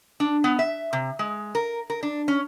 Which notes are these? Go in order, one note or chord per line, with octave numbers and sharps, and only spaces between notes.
D4
B3
E5
C3
G#3
A#4
A#4
D4
C#4